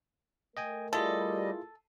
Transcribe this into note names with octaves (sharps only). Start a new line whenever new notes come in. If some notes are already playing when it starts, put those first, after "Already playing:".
A3 A#4 D#5 G5 G#5
G3 E4 F4 G#4 A4 D#5